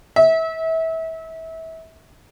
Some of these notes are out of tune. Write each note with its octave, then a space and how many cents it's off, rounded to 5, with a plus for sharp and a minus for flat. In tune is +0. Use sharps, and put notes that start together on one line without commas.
E5 -30